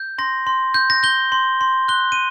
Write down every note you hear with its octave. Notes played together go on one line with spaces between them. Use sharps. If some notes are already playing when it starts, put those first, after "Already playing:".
Already playing: G6
C6 A#6
C6
G6
A#6
G6 G7
C6
C6
F#6 G7
D#7